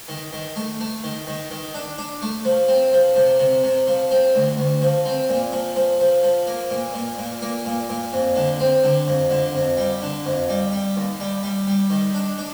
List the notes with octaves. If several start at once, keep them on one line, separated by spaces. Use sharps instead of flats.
D#3
D#3
A3
A3
D#3
D#3
D#3
D4
D4
A3
F3
C4
F3
C3
C3
C3
F3
C4
D2
D2
F3
C4
A#2
F3
F3
F3
F3
A#3
A#2
A#2
A#2
A#3
A#2
A#2
F2
D3
C4
D3
F2
D3
F2
G3
D3
F2
G3
G3
D#2
G3
G3
G3
D#3
D4
D4